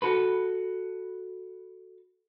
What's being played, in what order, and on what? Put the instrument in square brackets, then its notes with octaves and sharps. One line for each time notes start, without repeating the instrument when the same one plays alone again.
[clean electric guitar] F#4 A4 B4